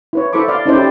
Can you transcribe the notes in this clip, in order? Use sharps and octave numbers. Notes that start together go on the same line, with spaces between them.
E4 B4 C#5
E4 A4 C5 B5 C#6 D6
D5 F5 C6
C#4 D#4 E4 A4 C5 D5
G4